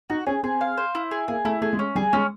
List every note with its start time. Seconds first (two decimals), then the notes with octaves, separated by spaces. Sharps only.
0.10 D#4 F#4
0.27 C#4 G#4
0.43 C4 G#4
0.61 F5
0.78 C5
0.95 E4
1.11 G#4
1.28 A#3 G#4
1.45 A3 E4
1.62 A3 G#4
1.73 G#3
1.79 C#4
1.95 G3 G#4
2.13 G#3 C#4